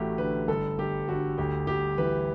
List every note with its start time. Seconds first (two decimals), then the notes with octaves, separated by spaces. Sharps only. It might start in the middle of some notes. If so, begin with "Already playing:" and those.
Already playing: A1 A3 F#4 G4
0.18 D3 B4
0.48 G1 A4
0.78 G1 G4
1.08 D3 F#4
1.38 D2 G4
1.67 D2 G4
1.98 E3 B4